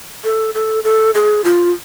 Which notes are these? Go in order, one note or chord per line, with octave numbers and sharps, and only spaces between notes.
A4
A4
A4
G#4
F4